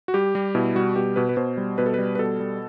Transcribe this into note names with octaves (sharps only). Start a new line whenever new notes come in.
F#4
G3 G4
G3
B2 E4
G3 F#4
B2 G4
B2 B4
B4
B2 C5
G3
B2 B4
A4
G3 B4
B4
B2 A4
G3